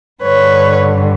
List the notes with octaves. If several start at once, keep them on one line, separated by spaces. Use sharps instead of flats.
G2 D3 B4 C#5